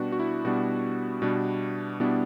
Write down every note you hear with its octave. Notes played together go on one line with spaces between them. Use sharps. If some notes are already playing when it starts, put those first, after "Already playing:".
Already playing: B2 G3 B3 D4 F#4 G4
F#4
E4
B2 G3 B3 D4 F#4
B2 G3 B3 D4
B2 G3 B3 D4 E4